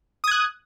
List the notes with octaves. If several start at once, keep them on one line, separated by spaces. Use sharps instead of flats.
D#6 F#6 G#6